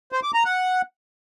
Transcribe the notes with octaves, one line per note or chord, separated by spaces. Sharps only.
C5
D6
A#5
F#5